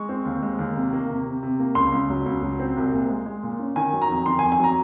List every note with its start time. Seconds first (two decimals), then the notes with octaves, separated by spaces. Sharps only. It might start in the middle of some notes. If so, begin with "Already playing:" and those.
Already playing: G#3 C#6
0.09 C4
0.25 D#2
0.43 G#3
0.59 D#2
0.76 C3
0.93 A#3
1.10 C3
1.26 C3
1.43 C3
1.59 A#3
1.75 C#2 C6
1.92 C#2
2.10 F#3
2.26 C#2
2.42 F#3
2.59 C4
2.77 C2
2.93 A#2
3.10 G#3
3.26 G#3
3.43 A#2
3.59 C#4
3.76 D#3 G#5
3.93 F#3
4.02 A#5
4.10 F2
4.26 D#3 C6
4.39 G#5
4.43 F2
4.52 G#5
4.59 F#3 A#5